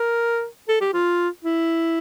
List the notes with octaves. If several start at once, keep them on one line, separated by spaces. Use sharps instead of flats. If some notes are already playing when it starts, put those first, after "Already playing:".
Already playing: A#4
A4
G4
F4
E4